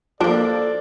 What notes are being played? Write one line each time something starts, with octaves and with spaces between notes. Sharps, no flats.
F3 A#3 D4 A4 D5